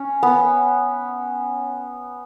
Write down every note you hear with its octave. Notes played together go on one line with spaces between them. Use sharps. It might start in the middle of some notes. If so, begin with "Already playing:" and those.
Already playing: C#4
B3